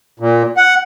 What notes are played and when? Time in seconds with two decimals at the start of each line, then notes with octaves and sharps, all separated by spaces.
0.20 A#2
0.57 F#5